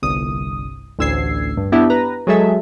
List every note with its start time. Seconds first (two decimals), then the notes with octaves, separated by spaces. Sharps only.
0.02 G1 C2 D#6
0.99 A1 D2 E6 G#6 C7
1.57 G2
1.72 B3 D4 E4 G4
1.90 B4 A#5
2.27 F#3 G#3 G#4 A4 E5